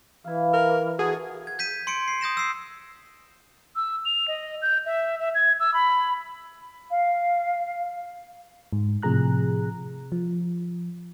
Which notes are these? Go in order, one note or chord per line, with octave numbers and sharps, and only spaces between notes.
E3 E4 F5
A#4
F#4 G#4 A4
G#6
G6 B6 D#7
C6 C#7 D7
C7
D#6 G6 A#6 E7
E6 C7
E6
F7
D#5
G6
E5
E5
G#6
E6
B5
F5
G#2
A2 C3 F3 G#4 A#5 F#6
F3